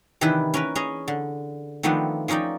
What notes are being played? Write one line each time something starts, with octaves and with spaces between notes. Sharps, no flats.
C3 D#3 E3 D4 E4 B4
C#4 A#4 B4
C#4 G#4 D#5
D3
D#3 F3 A3 B3 C4 D4
F3 C#4 D#4 D5 G5